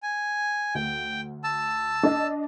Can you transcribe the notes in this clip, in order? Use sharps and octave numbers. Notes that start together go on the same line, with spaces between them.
G#5
D2 G5
A5 E6
D4 D#5 A6